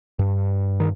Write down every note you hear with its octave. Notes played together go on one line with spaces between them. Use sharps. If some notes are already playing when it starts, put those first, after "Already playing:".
G2
D#3